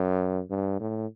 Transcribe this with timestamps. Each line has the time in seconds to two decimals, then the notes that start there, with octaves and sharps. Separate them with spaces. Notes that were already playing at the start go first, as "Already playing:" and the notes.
Already playing: F#2
0.50 G2
0.80 A2